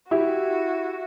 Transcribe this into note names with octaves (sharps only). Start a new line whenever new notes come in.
E4 F#4 G4